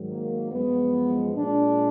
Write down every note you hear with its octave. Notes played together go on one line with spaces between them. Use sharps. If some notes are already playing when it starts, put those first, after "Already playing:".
Already playing: G#2 D#3 F#3
A#3
F#2 F3 G#3 B3
A#2 G#3 D4